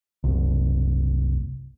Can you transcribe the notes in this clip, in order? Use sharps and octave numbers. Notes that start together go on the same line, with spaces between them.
F#1 C2